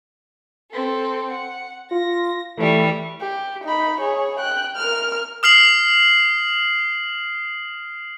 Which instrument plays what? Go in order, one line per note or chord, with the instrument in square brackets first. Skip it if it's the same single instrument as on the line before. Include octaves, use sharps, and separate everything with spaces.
[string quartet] C4 A4
F#5
[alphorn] F4 [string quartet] A#6
[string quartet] E3 G3 [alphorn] A3
[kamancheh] G4
D#4 B5
G#4 C#5
G5 F#6
A#4 F6
[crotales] D#6 F6 C7 F#7